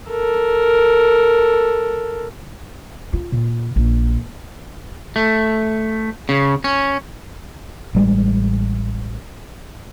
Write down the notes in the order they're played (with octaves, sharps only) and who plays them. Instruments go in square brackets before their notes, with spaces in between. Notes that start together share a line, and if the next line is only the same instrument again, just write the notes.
[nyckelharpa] A4 A#4
[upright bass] F4
A#2
A#1
[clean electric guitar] A3
C#3
C#4
[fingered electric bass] A1 G3 G#3